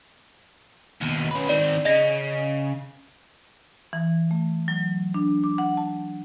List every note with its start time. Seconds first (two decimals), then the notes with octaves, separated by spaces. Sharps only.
1.01 D#2 B2
1.31 C#4 B4
1.49 D#3 C4 D5
1.85 C#3 D#5 A#6
3.93 E3
4.31 A3
4.68 F#3
5.14 D4
5.44 D6
5.58 F#5
5.77 A5